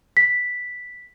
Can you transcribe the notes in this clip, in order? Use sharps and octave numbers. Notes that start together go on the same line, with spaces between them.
B6